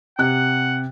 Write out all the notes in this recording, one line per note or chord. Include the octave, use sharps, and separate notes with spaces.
C3 F#5 F#6